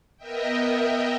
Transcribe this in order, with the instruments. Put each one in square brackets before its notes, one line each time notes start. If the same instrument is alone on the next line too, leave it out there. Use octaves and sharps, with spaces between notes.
[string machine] B3 A#4 D#5 E5 G5